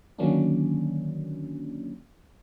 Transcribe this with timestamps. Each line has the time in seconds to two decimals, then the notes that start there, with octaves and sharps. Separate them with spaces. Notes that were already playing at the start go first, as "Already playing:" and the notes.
0.18 D3 D#3 F#3 A#3 C#4 D4